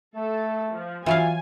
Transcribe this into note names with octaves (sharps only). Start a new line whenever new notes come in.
A3 A4
F3
E3 F#3 F4 F5 G#5